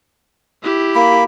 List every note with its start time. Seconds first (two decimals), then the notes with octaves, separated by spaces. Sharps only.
0.63 E4 G4
0.95 A#3 B5